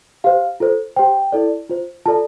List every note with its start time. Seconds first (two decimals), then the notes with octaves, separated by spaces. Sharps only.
0.24 G4 C5 F5
0.60 F4 A4 C5
0.96 G4 C5 G5
1.32 E4 A4 D5
1.69 F4 C5
2.05 F4 A4 D5 A5